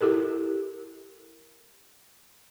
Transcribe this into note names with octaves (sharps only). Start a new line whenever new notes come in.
E4 G4 A4 A#4